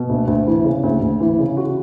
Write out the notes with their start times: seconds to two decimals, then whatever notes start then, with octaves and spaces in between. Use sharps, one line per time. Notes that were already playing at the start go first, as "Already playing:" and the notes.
Already playing: B2
0.09 D2
0.27 D2
0.47 E3
0.64 C#3
0.83 D2
1.01 D2
1.20 E3
1.39 C#3
1.57 F#4